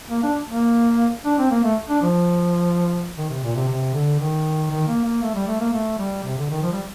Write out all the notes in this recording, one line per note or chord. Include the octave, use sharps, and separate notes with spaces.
A#3
D4
A#3
D4
C4
A#3
A3
D4
F3
D#3
C3
A#2
C3
C3
D3
D#3
D#3
A#3
A#3
A3
G3
A3
A#3
A3
G3
C3
D3
D#3
F3
G3